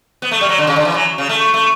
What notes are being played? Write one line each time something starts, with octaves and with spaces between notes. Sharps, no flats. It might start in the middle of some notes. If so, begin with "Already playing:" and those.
B3
A3
G3
F#3
D3
C#3
D3
E3
F#3
C#3
A3
A3